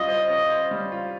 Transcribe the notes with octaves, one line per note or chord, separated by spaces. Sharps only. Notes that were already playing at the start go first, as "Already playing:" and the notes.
Already playing: G3 C#4 F4 D#5
C5
C#4
C5
G3
F4